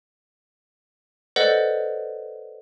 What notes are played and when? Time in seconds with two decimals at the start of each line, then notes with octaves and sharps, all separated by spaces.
1.36 A4 B4 C5 D5 D#5 F#5